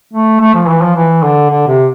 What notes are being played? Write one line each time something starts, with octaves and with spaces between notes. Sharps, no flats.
A3
A3
F3
E3
F3
E3
D3
D3
C3